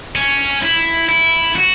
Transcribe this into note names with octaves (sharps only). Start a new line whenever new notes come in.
C#4
E4
E4
F#4